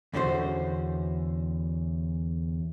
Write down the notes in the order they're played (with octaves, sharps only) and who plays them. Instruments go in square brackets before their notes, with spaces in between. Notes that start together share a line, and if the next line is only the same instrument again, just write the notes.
[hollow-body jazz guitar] E2 D3 C#4 F#4 C5